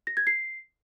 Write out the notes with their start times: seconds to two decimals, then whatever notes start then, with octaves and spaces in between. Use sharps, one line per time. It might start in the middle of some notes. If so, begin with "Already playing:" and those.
0.07 A#6
0.17 G#6
0.27 C7